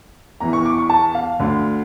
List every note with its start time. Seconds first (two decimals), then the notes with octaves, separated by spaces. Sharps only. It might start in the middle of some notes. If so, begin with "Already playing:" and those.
0.40 E2 E3 A#5
0.53 C#6
0.66 D6
0.78 C#6
0.90 A5
1.15 F5
1.40 D2 D3